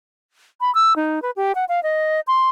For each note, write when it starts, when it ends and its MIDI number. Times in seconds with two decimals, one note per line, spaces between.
0.61 0.73 83
0.75 0.96 88
0.96 1.22 63
1.22 1.31 71
1.36 1.52 67
1.55 1.65 78
1.69 1.82 77
1.83 2.20 75
2.27 2.49 84